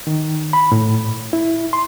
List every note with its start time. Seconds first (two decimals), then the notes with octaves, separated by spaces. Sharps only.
0.07 D#3
0.53 B5
0.72 A2
1.33 E4
1.73 C6